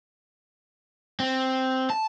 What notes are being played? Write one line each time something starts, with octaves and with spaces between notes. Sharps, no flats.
C4
A5